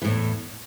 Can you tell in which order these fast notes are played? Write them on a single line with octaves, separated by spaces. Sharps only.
E3 A2 E2